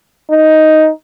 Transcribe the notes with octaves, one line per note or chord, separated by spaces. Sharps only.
D#4